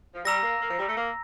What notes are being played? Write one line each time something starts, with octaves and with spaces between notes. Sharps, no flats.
F3
G3 A#5 E6 A#6
A#3
A#3
F3
G3
A3
A#3